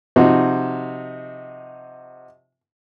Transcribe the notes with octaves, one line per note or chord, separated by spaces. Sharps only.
C3 F3 D#4 F#4